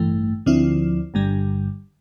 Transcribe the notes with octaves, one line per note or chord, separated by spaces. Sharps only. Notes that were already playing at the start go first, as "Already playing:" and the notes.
Already playing: A1 G2 E3 A3
D2 D3 F3 C4 E4
G1 G2 D3 G3